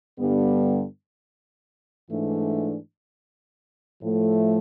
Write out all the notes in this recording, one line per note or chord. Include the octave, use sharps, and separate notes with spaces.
G2 D3 G3 B3
G#2 E3 A3 D4
A2 F3 A3